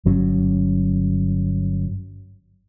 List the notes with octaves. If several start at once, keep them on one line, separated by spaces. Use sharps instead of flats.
G1 F#3 C#4